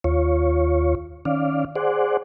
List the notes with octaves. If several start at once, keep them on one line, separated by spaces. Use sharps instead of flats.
D#2 F4 C#5
D#3 C#4 D5 F5
G#4 C5 D5 F#5